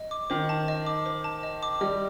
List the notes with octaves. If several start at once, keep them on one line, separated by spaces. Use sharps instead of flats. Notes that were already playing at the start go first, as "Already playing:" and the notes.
Already playing: D#5
D6
D#3 C5
A5
D#5
D6
C5
A5
D#5
D6
G3 D#5